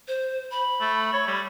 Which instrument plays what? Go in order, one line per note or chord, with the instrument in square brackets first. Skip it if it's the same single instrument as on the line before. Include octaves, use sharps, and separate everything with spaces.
[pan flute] C5
B5
[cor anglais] A3
C#5
G3